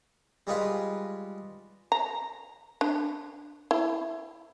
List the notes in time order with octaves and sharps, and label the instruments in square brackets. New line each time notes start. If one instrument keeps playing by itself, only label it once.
[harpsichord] G3 G#3 D#4 F4 B4
[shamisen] A#5
D4
E4